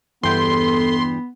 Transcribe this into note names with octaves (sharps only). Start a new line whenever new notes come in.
E2 G2 B3 A4 G5 C6